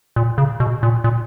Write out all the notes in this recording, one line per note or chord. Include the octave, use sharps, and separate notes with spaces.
A#2
C#3
B2
A#2
A#2